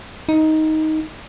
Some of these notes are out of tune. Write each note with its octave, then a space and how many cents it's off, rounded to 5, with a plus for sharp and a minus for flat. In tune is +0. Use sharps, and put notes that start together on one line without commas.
D#4 +10